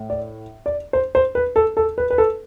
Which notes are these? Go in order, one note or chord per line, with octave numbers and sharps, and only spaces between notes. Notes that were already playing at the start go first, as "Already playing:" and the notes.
Already playing: A2
D5
D5
C5
C5
B4
A4
A4
B4
B4
A4